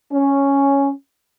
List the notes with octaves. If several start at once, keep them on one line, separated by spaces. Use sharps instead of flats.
C#4